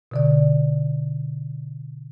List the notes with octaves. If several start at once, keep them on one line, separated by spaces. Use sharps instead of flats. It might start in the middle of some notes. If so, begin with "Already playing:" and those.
B2 D3 D5